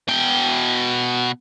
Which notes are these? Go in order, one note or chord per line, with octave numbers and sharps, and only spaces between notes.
B2 G5